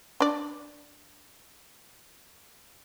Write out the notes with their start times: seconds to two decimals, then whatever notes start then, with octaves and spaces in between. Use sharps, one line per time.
0.20 D4 D5